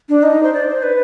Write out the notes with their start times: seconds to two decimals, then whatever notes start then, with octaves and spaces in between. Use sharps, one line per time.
0.09 D4
0.23 D#4
0.43 C5
0.53 D5
0.69 C5
0.83 B4